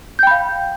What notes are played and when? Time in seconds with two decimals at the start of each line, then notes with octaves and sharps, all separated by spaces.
0.19 G6
0.23 G5
0.27 B5
0.31 F5